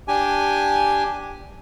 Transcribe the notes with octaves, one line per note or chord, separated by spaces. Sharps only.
D4 G4 G#5